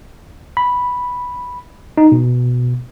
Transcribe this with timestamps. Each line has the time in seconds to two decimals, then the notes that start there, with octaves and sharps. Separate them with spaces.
0.57 B5
1.97 D#4
2.12 B2